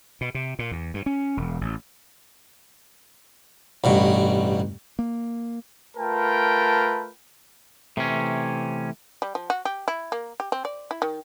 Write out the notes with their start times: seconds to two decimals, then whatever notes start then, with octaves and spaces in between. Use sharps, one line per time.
0.21 B2
0.35 C3
0.59 A#2
0.71 E2
0.94 G2
1.06 C#4
1.37 E1
1.61 A1
3.84 A1 G2 B2
4.99 A#3
5.97 A3 F4 A#4 B4 G5 A5
7.97 C3 E3 A3 C#4
9.22 G3
9.35 F3
9.50 F#4
9.65 G4
9.88 E4
10.12 A#3
10.40 G4
10.52 C4
10.65 D5
10.91 E4
11.02 D#3